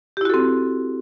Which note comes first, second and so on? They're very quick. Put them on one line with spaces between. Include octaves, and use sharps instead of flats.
G4 E4 F#4 A4 C4